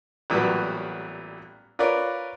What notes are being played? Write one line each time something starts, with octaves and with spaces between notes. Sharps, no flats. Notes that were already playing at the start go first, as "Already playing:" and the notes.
A1 A#2 F#3 G3 B3
F4 A#4 B4 C#5 D5